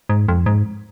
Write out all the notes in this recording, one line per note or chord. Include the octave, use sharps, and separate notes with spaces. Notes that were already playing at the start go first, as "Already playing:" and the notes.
G#2
F2
G#2